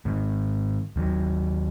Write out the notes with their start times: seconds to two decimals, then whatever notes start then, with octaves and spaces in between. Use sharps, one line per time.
0.05 G#2 D#3 G#3
0.96 D#2 D#3 F#3